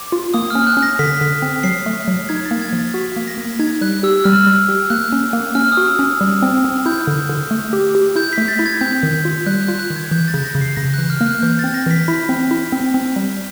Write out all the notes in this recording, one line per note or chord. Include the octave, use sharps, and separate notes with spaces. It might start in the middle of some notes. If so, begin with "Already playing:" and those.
Already playing: D6
F4
A#3 D#6
C#4 F6
F#6
C#4
A#6
D3 B6
D3
C4
F#3 C7
A3
F#3
D#4 G#6
A6
A#3
G#6
F3
A6
F#4 B6
A#3
A#6
A#3
D#4 G#6
G3 F#6
G4 E6
G3 F6
G3
G4
A#3 F#6
C#4
A#3
C#4 F6
D#6
F#4
E6
C#4
G3
C4
C4
E4 G6
D3
D3
A3
G4
G4
E4 G6
A3 B6
A6
E4
G#6
C4 G6
D#3
F4
G3 F#6
F#6
F4
F#6
D#3
G#6
E3 G6
A6
C#3
A#6
C#3
C7
C#3 A#6
E3 F#6
F6
A#3
F#6
E3 G6
C4 A6
A#6
E3 B6
E4
C4
E4
C4
C4
G3